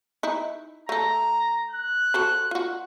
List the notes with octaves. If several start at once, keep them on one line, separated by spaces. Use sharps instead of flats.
D#4 E4
A3 A4 A#5
F#6
F#4 A4 C5
F4 F#4